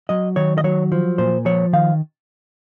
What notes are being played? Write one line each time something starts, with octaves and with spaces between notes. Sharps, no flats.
F#3 D#5
D#3 C#5
D#5
F#3 C#5
F3
A#2 C5
F3 C#5
D#3 F5